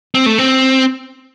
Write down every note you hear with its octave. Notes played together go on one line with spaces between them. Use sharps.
C4
A3
C4